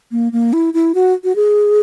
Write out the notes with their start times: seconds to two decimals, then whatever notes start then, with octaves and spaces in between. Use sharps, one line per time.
0.12 A#3
0.32 A#3
0.53 E4
0.74 E4
0.95 F#4
1.24 F#4
1.36 G#4